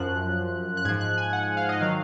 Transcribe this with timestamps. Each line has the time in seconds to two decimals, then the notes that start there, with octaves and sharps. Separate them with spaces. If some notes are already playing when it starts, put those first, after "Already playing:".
Already playing: F#2 F3 F#6
0.77 F#6
0.85 G#2 G#6
0.89 F3
1.01 F#6
1.17 G#5
1.33 F#5
1.57 F5
1.69 D#5
1.81 D#3 F#3 F5